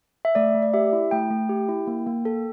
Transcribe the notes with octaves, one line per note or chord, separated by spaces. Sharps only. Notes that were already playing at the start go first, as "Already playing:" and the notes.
E5
A3 D5
A3
D5
G4 E5
E4
A3 G5
A3
G4
E4
A#3
A#3
A4